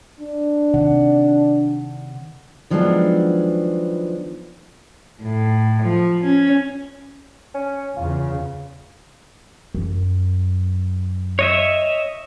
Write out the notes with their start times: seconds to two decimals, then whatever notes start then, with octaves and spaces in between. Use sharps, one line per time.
0.21 D4
0.74 C3 D#3 F#5
2.70 D#3 F3 F#3 G#3 B3 D4
5.22 A2
5.82 F3
6.24 C#4
7.54 C#4
7.97 E2 C#3 F4
9.75 F#2
11.39 C#5 D#5 E5